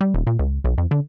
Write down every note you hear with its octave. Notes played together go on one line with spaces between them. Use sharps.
G3
D#1
A#2
C#2
B1
F2
D3